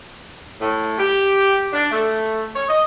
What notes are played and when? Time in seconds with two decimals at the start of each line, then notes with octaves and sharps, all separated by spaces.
0.61 A2
0.98 G4
1.73 D4
1.91 A3
2.56 C#5
2.69 D#5